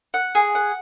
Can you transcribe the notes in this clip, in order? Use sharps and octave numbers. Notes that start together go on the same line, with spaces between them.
F#5
G#4
F#5